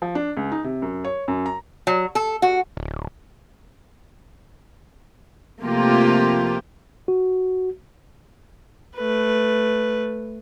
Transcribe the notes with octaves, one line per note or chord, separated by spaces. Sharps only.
F3
D4
C#2
D#4
C3
F#2
C#5
F#2
A#5
F#3
A4
F#4
D1
C3 F3 A3 A#3 F4 G4
F#4
A3 B4